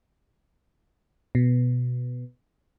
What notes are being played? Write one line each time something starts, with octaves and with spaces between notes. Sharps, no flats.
B2